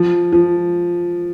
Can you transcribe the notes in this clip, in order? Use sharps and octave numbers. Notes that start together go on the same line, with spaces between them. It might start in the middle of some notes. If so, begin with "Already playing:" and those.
Already playing: F3
F3